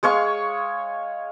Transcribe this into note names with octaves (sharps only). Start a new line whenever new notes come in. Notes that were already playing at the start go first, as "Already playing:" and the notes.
G#3 C#5 F5 C#6